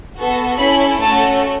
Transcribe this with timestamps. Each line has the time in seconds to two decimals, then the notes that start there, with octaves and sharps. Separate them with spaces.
0.16 B3 F#4 A4
0.58 C#4 E4 A4 B5
1.00 A3 C#4 F#4 A4 A5